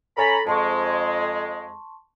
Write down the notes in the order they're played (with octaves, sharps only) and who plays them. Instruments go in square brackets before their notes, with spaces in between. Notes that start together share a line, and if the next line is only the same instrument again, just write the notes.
[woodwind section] C#4 A#5 B5 [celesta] A4 A6 A#6
[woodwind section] F2 G#3 [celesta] A5 C6 C#6